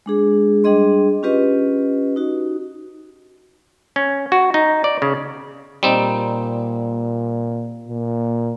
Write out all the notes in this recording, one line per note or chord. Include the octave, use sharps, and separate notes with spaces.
G#3 D4 G#4
G3 D4 G#4 D#5 C6
C#4 F4 G4 B4 D#5
D#4 F#4
C#4
F#4
D#4
D5
C#3
A#2 G3 C4 D#4
A#2